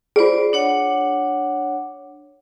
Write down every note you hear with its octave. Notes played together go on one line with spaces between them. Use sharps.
F4 G#4 C5 D5
D4 C#5 F#5